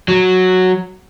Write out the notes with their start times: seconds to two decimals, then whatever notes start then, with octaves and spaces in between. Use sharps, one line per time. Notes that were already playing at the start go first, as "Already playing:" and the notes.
0.08 F#3